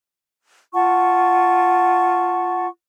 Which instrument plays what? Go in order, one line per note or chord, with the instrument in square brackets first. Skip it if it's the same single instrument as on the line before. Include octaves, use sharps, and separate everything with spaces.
[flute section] F4 F#5 A5 C#6